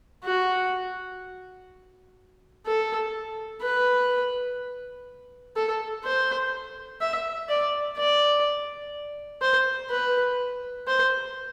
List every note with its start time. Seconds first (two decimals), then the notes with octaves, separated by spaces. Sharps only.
0.24 F#4
2.66 A4
3.62 B4
5.56 A4
6.04 C5
7.01 E5
7.49 D5
7.97 D5
9.42 C5
9.90 B4
10.87 C5